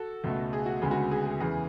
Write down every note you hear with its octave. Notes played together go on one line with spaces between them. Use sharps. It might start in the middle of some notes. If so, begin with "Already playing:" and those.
Already playing: F#4 A4
C#2 B2 A3
G#4
F#4
D2 C#3 G#3 B3
F#4
G#4
G#4
E2 C#3 E3 G#4